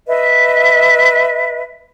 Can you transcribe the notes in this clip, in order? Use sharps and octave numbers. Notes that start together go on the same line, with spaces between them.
B4 D#5 E5